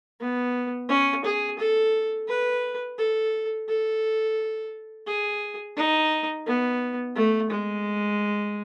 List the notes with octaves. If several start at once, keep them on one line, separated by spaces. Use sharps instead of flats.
B3
C#4
G#4
A4
B4
A4
A4
G#4
D#4
B3
A3
G#3